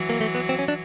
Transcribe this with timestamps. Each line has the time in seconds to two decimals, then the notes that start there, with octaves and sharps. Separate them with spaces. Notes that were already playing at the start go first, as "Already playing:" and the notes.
Already playing: E3 F#3
0.09 A#3
0.21 A3
0.35 B3
0.49 C4
0.59 C#4
0.68 D4